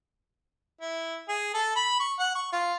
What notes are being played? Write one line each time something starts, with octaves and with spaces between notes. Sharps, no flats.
E4
G#4
A4
B5
C#6
F#5
C#6
F4